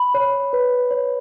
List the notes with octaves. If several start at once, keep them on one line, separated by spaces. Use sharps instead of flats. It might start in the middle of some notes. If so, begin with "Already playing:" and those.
Already playing: B5
C#5
B4
C#5